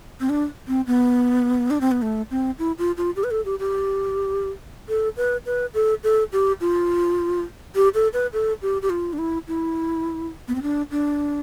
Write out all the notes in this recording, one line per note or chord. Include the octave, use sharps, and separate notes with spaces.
C4
D4
C4
B3
D4
C4
B3
A3
C4
E4
F4
F4
G4
B4
A4
G4
G4
A4
B4
B4
A4
A4
G4
F4
G4
A4
B4
A4
G4
G4
F4
D4
E4
E4
B3
C4
D4
D4